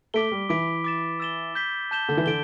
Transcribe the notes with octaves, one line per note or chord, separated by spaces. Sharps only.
A3 D6 B6 D7 G7
G3
E3 B5 D6 B6 D7
D6 A6 E7
E6 A6 E7 G7
G6 B6 G7
A5 G6 E7 G7
D3
E3
D3 D7 G7